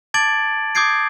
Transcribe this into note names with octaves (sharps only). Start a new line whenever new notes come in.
A5 D6 G#6 A6 D7 F#7
D6 D#6 G6 G#6 C7 D7